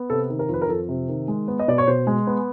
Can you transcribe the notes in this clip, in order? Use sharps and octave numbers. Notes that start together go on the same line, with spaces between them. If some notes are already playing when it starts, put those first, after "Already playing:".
Already playing: B3
C3 A4
D#3
A#4
F2 B4
A#4
F2 A4
C3
D#3
G#3
B3
D#5
B2 D5
C#5
B2 C5
G#3
B3